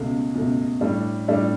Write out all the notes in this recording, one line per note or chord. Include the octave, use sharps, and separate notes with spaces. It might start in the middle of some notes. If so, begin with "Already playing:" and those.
Already playing: C#2 B2 A3
C#2 B2 A3
A2 G3 D4 A4
A2 G3 D4 A4